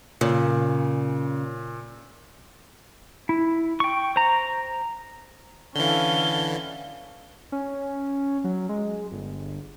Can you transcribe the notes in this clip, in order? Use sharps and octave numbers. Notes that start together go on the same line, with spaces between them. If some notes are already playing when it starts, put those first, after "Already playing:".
A#2 C#3
E4
G5 C#6
C5 A#5
D3 E3 C#4 A4 F5 G7
C#4
F#3
G#3
G1